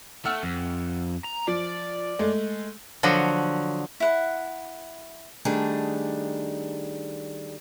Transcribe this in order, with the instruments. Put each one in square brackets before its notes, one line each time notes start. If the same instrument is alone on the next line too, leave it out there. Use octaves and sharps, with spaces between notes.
[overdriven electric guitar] A3 [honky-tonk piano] F#5 E6 F6
[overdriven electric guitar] F2
A#5
[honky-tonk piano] F3 [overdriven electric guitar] D5
[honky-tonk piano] G#3 A3
[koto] D3 F3 F#3 F#4
[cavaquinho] E4 F#5
[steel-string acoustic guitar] D#3 G3 A3 D4 G#4